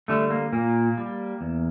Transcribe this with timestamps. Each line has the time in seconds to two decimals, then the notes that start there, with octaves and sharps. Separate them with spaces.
0.08 D3 G3 A3
0.30 A#3
0.53 A#2 A#3
0.97 G3
1.41 E2